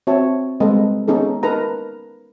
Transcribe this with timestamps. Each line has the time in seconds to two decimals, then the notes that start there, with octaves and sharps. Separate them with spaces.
0.07 C4 F#4 C#5 E5 A5
0.60 G3 G#3 C4 A4 B4 D#5
1.08 B3 C#4 D#4 G#4 A4
1.43 D#4 A#4 B4 A5 A#5